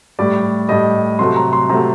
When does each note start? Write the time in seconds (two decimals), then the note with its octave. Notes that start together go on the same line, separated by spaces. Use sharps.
0.19 A2 G3 D5
0.69 A2 G3 D#5
1.19 C3 F#3 A3 C6
1.36 A#5
1.53 C6
1.69 C3 F#3 A3 A#5